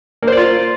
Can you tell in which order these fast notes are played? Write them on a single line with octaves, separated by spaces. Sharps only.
A#3 C5 D5 F4